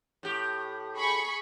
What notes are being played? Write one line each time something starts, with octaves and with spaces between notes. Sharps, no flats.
A2 G4
G#4 B5 C#6